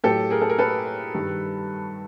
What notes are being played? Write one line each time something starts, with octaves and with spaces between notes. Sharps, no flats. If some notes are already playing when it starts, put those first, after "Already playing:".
A2 F#3 G4 A4
G#4 A#4
A4
A#4
A4 B4
G2 D#3 G3